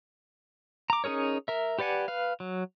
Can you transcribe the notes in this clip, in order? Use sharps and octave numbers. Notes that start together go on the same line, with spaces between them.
A#5 D6
C#4 D#4 G#4 A#4 C#5
A#4 E5
G4 B4 D5 F#5 G#5
B4 F5
F#3